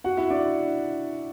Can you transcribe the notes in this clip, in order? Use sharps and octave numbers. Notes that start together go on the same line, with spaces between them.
F#4 F#5
E4 E5
D4 D5